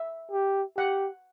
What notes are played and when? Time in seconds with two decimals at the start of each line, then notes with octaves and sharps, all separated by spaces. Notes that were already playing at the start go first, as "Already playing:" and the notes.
Already playing: E5
0.31 G4
0.77 G4 F#5